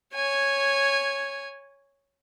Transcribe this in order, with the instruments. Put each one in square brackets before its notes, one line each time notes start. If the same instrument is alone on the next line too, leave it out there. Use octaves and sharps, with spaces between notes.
[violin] C#5 G#5